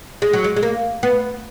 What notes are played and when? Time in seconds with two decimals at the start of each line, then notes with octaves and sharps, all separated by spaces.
0.22 G#3
0.33 F#3
0.44 G#3
0.57 G#3
0.63 A#3
1.03 B3